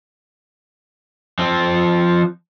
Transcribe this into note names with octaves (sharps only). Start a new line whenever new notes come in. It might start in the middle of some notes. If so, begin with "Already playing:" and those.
F3 C4